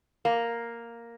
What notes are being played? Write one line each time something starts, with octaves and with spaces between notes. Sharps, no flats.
A#3